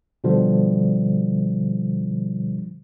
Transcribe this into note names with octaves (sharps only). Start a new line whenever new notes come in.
B2 D3 F3 G3